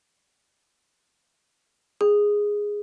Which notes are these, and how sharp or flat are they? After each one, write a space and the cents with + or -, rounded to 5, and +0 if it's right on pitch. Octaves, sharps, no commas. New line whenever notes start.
G#4 -5